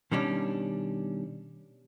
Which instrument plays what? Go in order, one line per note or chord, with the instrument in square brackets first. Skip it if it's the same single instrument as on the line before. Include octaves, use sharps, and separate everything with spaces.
[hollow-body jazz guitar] B2 D#3 G3 C#4 D4